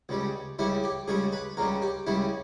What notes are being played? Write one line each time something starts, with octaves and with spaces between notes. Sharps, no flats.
C#2 C#3 G3
C#2 C#3 G3 E4
G4
C#2 C#3 G3 G#4
B4
C#2 C#3 G3 A#4
G4
C#2 C#3 G3 E4